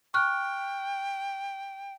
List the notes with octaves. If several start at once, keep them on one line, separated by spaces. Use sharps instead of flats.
G5 C#6 F6 F#6